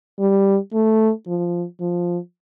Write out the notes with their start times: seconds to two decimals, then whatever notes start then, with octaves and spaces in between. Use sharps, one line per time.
0.20 G3
0.73 A3
1.27 F3
1.80 F3